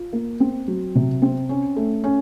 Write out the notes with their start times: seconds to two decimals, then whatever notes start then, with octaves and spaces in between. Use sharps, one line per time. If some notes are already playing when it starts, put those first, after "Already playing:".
Already playing: F4
0.13 A#3
0.40 C4
0.68 F#3
0.95 C3
1.22 C4
1.49 C#4
1.76 A3
2.04 C#4